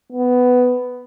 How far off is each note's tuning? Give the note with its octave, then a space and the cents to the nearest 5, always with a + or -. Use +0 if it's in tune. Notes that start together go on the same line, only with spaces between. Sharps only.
B3 +10